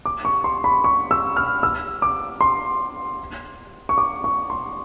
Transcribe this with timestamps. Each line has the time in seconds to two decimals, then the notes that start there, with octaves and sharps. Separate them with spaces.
0.06 D6
0.25 C#6
0.44 C6
0.64 B5
0.84 C#6
1.11 E6
1.37 F6
1.63 E6
2.02 D6
2.41 C6
3.89 C#6
3.98 D6
4.24 C#6
4.50 C6